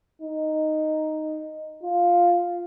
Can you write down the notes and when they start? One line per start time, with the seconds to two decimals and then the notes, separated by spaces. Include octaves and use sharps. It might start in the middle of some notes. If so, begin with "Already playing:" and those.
0.22 D#4
1.83 F4